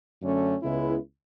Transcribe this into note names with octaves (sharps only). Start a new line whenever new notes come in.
F#2 D3 A3 C#4
C#2 C#3 G#3 B3 E4